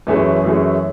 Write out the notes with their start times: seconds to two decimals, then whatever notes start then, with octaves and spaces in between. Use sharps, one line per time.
0.07 F#2 E3 A3 C#4 G#4
0.44 F#2 E3 A3 C#4 G#4